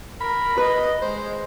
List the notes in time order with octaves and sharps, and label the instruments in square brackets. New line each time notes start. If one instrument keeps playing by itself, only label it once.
[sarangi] A#4 [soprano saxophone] B5
[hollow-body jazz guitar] B4 [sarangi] D#5
[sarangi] G#3 [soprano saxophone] C5